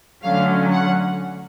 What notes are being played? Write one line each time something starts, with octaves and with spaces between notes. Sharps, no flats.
D3 F#3 A3 C#4 F5
F#5